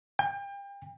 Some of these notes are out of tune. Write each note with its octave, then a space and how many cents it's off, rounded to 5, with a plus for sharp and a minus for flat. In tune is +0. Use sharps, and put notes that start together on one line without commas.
G5 +35